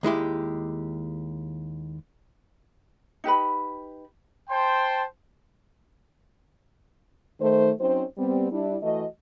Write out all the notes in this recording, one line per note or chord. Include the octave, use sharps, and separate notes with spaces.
D#2 G#3 E4 G4
D#4 G4 B4 B5
C5 G5 A5 C6
D#3 A3 C5
F#3 C4 C#4 D#4 C5
G3 B3 C4
G3 D4 E4
E3 A3 F#4 D#5